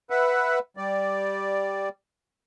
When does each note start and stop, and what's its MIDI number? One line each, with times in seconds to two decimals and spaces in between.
0.10 0.59 71
0.10 0.59 76
0.10 0.59 78
0.77 1.89 55
0.77 1.89 74